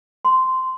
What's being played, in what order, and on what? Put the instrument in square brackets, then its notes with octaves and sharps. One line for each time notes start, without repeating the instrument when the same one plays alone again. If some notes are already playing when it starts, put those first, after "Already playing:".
[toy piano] C6